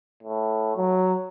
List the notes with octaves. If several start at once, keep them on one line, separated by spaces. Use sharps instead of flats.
A2
F#3